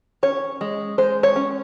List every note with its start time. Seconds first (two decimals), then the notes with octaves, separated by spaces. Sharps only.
0.23 C#4 C#5
0.61 G#3
0.98 G#3 C5
1.23 C#5
1.36 C#4